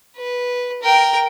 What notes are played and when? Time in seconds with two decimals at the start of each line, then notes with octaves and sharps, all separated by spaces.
0.16 B4
0.82 A#4 G5